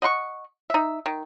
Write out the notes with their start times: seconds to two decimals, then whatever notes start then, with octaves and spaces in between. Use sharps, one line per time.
0.02 D#5 F#5 C6 C#6
0.70 D#4 E5
1.06 D#3